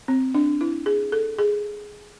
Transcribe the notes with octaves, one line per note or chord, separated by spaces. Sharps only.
C4
D4
E4
G#4
A4
G#4